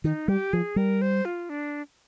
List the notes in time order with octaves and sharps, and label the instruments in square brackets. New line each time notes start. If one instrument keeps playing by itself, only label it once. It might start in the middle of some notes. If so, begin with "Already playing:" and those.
[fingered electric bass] D#3 [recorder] D#4
[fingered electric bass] G3 [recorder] G4
[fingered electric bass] F3 [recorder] G#4
[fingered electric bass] G3 [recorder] A#4
[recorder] C5
F4
D4